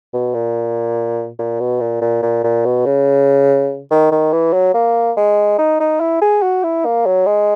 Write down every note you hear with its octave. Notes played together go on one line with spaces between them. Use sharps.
B2
A#2
A#2
B2
A#2
A#2
A#2
A#2
B2
C#3
D#3
D#3
E3
F#3
A#3
G#3
D#4
D#4
E4
G#4
F#4
E4
A#3
F#3
G#3